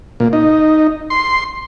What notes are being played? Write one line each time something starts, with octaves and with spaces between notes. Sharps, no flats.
A#2
D#4
C6